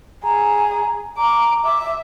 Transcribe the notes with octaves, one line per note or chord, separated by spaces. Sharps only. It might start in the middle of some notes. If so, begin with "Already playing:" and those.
G#4 A#5
A#5 D6
E5 D6